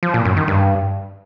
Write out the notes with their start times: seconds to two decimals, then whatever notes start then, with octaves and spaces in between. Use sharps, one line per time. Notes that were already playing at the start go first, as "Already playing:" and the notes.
0.03 F3
0.14 A#2
0.25 F#2
0.37 D#3
0.48 G2